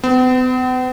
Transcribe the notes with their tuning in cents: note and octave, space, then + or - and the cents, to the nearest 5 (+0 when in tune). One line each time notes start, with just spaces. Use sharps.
B3 +45